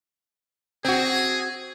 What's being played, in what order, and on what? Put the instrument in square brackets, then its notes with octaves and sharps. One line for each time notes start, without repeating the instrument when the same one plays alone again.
[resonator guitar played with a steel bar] C4 F#4 [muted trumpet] G#4